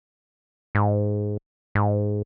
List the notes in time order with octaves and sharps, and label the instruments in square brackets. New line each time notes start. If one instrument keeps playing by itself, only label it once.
[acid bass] G#2
G#2